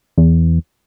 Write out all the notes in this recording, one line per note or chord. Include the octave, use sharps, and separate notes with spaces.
E2